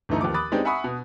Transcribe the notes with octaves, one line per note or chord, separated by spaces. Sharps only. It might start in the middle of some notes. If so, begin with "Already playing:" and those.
G1 E3 A3 D#4 A#5
D#2 F3 D6
B5 D6 D#6 F#6 A6
G#3 B3 C4 D4 D#4 G4
E5 F#5 G#5 B5 C#6 D#6
B2